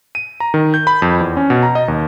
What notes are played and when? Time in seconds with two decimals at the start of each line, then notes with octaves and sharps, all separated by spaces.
0.15 D#7
0.40 A#5
0.54 D#3
0.74 G6
0.87 B5
1.02 F2
1.21 E2
1.37 C#4
1.50 B2
1.63 A#5
1.75 D#5
1.88 D#2